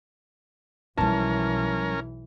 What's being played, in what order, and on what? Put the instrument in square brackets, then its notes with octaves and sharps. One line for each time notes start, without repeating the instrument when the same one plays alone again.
[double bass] B1 E3 [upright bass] F3 G3 [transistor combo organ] C#4 A#4 [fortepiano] A5